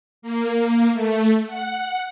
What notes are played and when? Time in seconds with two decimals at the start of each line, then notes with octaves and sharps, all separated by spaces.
0.22 A#3
0.92 A3
1.47 F#5